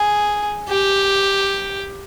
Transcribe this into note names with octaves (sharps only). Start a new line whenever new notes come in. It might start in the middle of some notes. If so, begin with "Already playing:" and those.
Already playing: G#4
G4